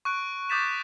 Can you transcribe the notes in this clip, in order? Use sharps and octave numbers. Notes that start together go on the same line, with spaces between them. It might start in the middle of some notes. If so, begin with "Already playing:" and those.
C#6 F#6 D7
D6 D#6 G6 A6 B6 E7